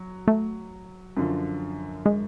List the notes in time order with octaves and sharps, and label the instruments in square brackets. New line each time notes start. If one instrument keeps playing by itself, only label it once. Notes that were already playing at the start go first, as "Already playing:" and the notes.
Already playing: [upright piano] F#3
[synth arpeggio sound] A3
[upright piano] F#2 D3 F3
[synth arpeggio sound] G#3